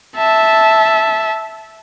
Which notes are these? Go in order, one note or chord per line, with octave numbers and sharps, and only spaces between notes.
E5 A5